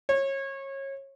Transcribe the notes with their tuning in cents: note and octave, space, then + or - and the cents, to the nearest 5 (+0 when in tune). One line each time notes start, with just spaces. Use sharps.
C#5 -25